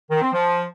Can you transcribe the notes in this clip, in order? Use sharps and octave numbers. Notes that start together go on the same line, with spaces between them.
D#3
C4
F3